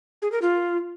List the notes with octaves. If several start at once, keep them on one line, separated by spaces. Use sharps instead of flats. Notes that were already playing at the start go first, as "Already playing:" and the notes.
G#4
A#4
F4